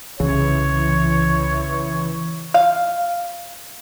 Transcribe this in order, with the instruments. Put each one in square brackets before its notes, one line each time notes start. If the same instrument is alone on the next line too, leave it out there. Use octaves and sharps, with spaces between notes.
[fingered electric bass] C2 [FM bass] C#3 [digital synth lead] E3 [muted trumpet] C#5
[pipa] F5